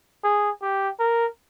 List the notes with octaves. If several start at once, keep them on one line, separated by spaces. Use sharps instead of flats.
G#4
G4
A#4